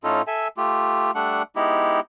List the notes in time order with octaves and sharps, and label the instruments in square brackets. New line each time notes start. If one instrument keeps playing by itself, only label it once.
[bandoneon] A2 C#4 D#4 F4 A4
A4 E5 G#5
A3 F4 G4
G3 A3 D4 F#5
G#3 B3 D#4 E4 G4